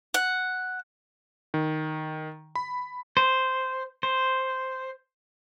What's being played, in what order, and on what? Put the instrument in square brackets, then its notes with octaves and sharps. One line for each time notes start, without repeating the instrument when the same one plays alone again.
[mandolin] F#5
[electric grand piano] D#3
B5
[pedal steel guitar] C5
C5